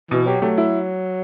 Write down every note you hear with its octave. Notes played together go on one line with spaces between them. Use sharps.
B2 E3
F#3 G4
F#3 A3
E4